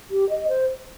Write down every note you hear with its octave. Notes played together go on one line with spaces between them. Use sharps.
G4
D#5
C5